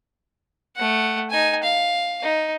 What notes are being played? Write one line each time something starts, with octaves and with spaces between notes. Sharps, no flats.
A3 F#5
D#4 G#5
F5
D#4